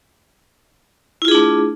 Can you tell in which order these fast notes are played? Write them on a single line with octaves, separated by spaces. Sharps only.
E4 F4 G#4 D4 A3